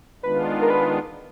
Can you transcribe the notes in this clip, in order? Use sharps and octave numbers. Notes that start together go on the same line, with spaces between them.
D#3 G#3 B3 D4 F4 B4
A#4
B4